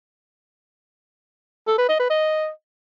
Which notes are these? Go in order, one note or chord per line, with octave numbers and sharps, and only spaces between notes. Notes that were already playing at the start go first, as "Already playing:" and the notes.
A4
B4
D#5
B4
D#5